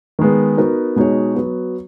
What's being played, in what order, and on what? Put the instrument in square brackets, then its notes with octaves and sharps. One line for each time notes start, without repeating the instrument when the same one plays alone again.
[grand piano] D#3 G#3 B3
B3 D#4 F#4 A#4
B2 G#3 D#4 F#4 C#5
F#3 B3 F#4